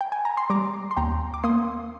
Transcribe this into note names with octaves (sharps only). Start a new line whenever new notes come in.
G5
G#5
A#5
C6
G3 A#5 D6
C6
D#2 G5 A#5
D6
A#3 C6 D#6